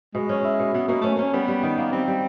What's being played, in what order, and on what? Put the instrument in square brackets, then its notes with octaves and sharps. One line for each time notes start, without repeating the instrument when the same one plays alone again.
[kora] B2 [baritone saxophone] G#3
[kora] C#4
E4
B2
[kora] B2 [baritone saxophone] B3
[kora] B2 [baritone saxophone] A#3
[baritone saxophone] A3 [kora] C#4
[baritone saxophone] A#3 [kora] C#4
[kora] G3 [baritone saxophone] B3
[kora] G3
D#3
A#3
[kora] G3 [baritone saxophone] C4
[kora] G3